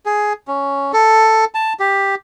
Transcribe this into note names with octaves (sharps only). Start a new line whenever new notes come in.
G#4
C#4
A4
A5
G4